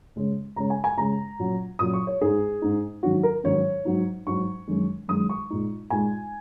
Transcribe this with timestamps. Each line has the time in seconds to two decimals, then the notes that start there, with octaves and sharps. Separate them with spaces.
0.16 C#3 G#3 C#4
0.56 C#3 G#3 C#4 A#5
0.70 G#5
0.84 G#5
0.97 C#3 G#3 C#4 A#5
1.39 A#2 F#3 C#4
1.79 A#2 F#3 C#4 D#6
1.94 C#6
2.07 C#5
2.21 G#2 G#3 D#4 G#4
2.62 G#2 G#3 D#4
3.02 G#2 D#3 F#3 C#4 F#4
3.23 A#4
3.44 G#2 D#3 F#3 C#4 C#5
3.85 G#2 F#3 D#4
4.27 G#2 F#3 D#4 C#6
4.67 F#2 D#3 G#3
5.08 F#2 D#3 G#3 D#6
5.30 C#6
5.50 A#2 G#3 D#4
5.90 A#2 G#3 D#4 G#5